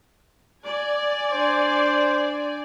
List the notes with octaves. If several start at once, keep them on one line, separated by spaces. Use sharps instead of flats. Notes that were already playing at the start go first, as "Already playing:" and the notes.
D5 G#5
D4 C5